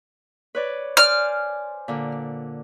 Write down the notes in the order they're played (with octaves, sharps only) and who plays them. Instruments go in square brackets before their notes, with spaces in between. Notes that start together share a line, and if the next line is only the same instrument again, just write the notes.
[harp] B4 C#5 D5
[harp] C5 D5 G#5 [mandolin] F6
[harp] A#2 D3